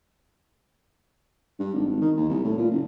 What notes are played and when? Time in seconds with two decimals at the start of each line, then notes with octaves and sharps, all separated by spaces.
1.60 G2
1.74 G#1
1.86 G#1
2.01 D#3
2.17 D#2
2.30 C2
2.45 A2
2.58 A#2
2.71 F#1